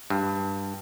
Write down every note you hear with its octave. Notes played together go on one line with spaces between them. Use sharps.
G2